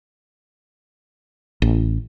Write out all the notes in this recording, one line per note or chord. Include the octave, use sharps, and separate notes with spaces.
A1